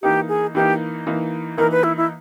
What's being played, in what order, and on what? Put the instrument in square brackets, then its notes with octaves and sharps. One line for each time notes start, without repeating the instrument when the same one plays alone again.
[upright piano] E3 A#3 D#4 [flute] G4
[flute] G#4
[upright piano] E3 A#3 D#4 [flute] G4
[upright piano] E3 A#3 D#4
[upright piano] E3 A#3 D#4 [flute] A#4
[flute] B4
E4
E4